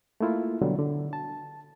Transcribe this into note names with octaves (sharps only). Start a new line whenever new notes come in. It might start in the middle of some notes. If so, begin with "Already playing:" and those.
A3 A#3 E4 F4
B2 D3 F#3 G3
D3
A5